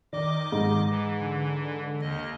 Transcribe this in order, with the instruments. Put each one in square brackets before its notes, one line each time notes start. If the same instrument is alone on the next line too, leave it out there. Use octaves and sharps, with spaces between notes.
[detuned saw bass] D#3 [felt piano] D5 [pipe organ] D#5 D6
[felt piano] G#2
[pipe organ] E3
[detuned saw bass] D3
[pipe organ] D#2 D#5